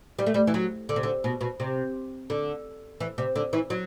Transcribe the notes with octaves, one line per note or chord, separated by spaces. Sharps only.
G3
A3
G3
E3
F#3
D3
C3
D3
B2
B2
C3
D3
E3
C3
D3
E3
F#3